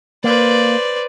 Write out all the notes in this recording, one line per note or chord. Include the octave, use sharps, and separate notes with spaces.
A#3 B4 C5 D5